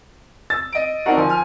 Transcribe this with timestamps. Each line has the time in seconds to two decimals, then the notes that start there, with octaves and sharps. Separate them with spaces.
0.50 E6 A6
0.73 D#5 D7
1.06 C4 D4 D#4 F#4 A#4 F#5
1.17 F3 G#5
1.29 G#5 F6